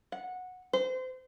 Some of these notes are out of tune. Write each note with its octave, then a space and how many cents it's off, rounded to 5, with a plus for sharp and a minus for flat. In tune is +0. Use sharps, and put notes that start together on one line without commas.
F#5 -15
C5 -30